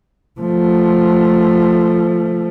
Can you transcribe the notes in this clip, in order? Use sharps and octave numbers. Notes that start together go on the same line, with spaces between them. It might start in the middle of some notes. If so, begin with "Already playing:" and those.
F3 A3